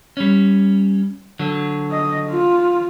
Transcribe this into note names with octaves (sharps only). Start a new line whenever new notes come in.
G3 C#4
D3 F#3
D#5
F4